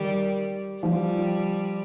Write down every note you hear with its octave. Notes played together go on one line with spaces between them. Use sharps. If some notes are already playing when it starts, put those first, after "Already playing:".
Already playing: D#3 G3
F3 G3